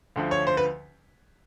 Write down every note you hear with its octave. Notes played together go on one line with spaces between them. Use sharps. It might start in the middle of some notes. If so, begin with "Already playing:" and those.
D2 D3 F3
C#5
C5
B4